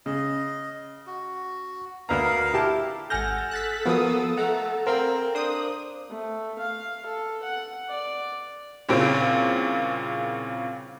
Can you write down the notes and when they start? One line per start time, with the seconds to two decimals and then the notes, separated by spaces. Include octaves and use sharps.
0.06 C#3 D#5
1.07 F#4
2.09 D2 A#4 B4 F5 A#5
2.53 E4 G4 A5
3.10 G#1 A4 F#5 G#5 F6 G6 A#6
3.51 F#6 A6 B6
3.86 F3 A#3 B3 F#4 D#6
4.37 A3 F#5 A#5
4.87 C4 A#4 C5 F5 A#5
5.35 D4 C5 D#6
6.10 A3
6.59 F5
7.06 A4
7.43 F#5
7.89 D5
8.89 C2 A#2 C#3 C4 D7